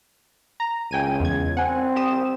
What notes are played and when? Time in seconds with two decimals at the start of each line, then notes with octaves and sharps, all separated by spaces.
0.60 A#5
0.91 C#2 G5 G#5 D#7
1.20 E2 G#6
1.57 C4 F#5 G#5
1.96 G4 D#6 E7